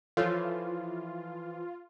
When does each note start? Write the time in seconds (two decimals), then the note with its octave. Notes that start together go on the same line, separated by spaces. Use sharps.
0.17 E3 F3 F4 A4 C#5 E6